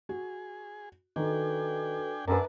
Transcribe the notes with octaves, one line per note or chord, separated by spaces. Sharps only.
F#4 G#4
D#3 D4 F#4 A4 B4 G5 G#5
F#2 D4 B4 A5 A#5